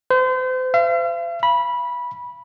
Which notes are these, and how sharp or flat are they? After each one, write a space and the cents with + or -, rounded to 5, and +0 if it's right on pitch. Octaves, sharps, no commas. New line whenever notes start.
C5 -35
F5 -45
B5 -15